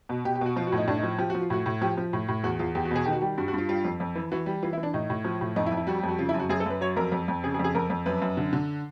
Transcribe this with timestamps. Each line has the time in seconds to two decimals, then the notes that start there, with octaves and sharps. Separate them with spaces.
0.09 B2
0.25 B2 G4
0.35 G4
0.41 B2 F#4
0.56 F3 F4
0.67 F#4
0.72 A2
0.78 D#4
0.88 A2 D4
0.98 D#4
1.03 F3
1.19 F3 G4
1.30 F3 F#4
1.41 F4
1.50 A2 F#4
1.66 A2
1.81 F3 G4
1.97 F3
2.13 A2
2.28 A2
2.44 E2 F#4
2.59 E2 F4
2.75 E2 G4
2.85 F#4
2.91 B2 G#4
3.04 D#3 G4
3.12 F#4
3.21 G3 G4
3.38 G2 F#4
3.48 F#4
3.54 G2 F4
3.69 G3 F4
3.85 F2
4.00 F2
4.15 E3
4.32 E3 F#4
4.46 G3
4.62 E3 F4
4.73 E4
4.78 E3
4.83 D4
4.94 A2 D#4
5.10 A2
5.25 F3
5.41 A2
5.56 F2 D#4
5.67 E4
5.72 F2
5.77 E4
5.87 G3 F#4
5.98 G4
6.03 F2
6.09 F#4
6.19 C#3 F4
6.29 E4
6.34 F#2
6.39 F#4
6.49 F#2 G#4
6.60 A4
6.66 F#2 B4
6.81 F#3 C#5
6.96 F2 A#4
7.12 F2
7.28 F2
7.44 C#3 G#4
7.54 G#4
7.59 F2
7.64 G#4
7.75 F2 A#4
7.90 F2
8.06 F#2 B4
8.22 F#2
8.37 D3
8.53 D3